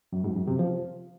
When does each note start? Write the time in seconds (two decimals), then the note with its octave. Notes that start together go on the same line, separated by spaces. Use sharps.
0.12 F#2
0.24 G#2
0.36 F#2
0.47 C3
0.59 F3